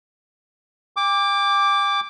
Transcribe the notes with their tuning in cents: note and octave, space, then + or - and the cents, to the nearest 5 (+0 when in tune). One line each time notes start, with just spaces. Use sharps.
G5 +40 D6 +0